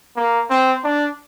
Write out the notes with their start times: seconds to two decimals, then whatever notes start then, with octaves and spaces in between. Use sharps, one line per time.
0.16 A#3
0.50 C4
0.84 D4